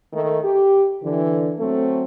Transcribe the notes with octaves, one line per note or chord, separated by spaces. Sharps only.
D#3 A3
G4
D3 E3
F#3 A3 C4